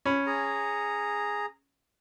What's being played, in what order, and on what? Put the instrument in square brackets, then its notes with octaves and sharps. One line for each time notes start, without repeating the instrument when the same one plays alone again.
[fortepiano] C#4 B5
[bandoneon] G#4 A#5